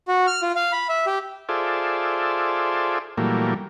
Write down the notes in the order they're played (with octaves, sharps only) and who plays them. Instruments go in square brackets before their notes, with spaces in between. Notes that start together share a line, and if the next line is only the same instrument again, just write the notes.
[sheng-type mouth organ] F#4
F6
F4
F5
B5
E5
G4
[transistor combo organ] F4 G#4 A4 C5 D5 E5
A#2 E3 F#3 G3 A3 A#3